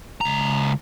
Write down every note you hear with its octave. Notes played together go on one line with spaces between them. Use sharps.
C#2 A#5